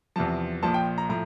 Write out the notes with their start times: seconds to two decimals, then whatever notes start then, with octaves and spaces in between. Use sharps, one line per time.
0.16 E2 C3 F3 A5
0.63 A#1 A#2 F3 A5
0.74 G5
0.98 A#5
1.09 A2 F3 A#5